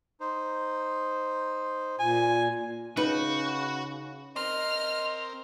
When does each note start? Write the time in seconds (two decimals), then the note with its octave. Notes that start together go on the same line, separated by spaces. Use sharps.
0.20 D#4 C5
1.99 A#2 G#5
2.97 C#3 D#4 F#4 B4
4.36 C4 A#4 D#5 C6 F6